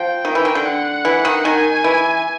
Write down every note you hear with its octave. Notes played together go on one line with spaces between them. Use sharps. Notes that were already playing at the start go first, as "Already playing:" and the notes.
Already playing: F3 G5
D#3
E3
D#3
D3
F#5
E3
D#3
D#3 G#5
E3